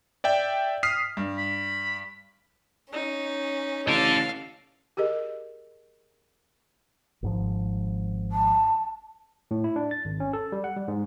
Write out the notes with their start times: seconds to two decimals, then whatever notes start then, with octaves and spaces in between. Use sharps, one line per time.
0.24 D5 E5 G5
0.83 D#6 F6 B6 C7
1.17 G2
1.38 B5
2.93 C#4 D#4
3.88 A1 A4 D5 F5
4.97 G4 G#4 A#4 D#5
7.22 G#1 G#2 F3
8.32 A5
9.51 A2
9.64 E4
9.76 D4
9.91 A6
10.05 G#1
10.20 C#4
10.33 A4
10.52 G3
10.64 F#5
10.76 G3
10.88 G#2